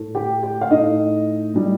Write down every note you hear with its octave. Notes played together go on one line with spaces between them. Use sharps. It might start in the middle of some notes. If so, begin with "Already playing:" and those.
Already playing: A2 A3
G4 G5
G4 G5
F5
A2 A3 D#4 D#5
A2 G3